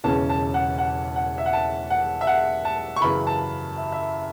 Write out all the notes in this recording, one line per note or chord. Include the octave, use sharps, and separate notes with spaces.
E1 E2 C#3 E3 C#4 A5
A5
F#5
F#5
F#5
E5
F#5
A5
F#5
E5
F#5
A5
C#6
F#2 C#3 E3 B3 B5
A5
E5
E5